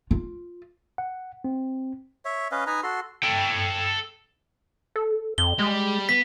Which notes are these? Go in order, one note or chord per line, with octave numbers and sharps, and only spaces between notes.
F4
F#5
C4
C#5 E5
C#4 B4 D#5 F5
D#4 B4 G#5 A#5
F#4 A4 C6
A4 G5
A4
F2 G7
G3 G#3
B3 B6